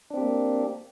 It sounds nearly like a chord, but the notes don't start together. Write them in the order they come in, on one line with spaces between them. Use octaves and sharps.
D4 C4 G4 A#3